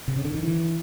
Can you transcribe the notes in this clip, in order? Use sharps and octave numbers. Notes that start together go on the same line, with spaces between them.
C3
C#3
D3
D#3
E3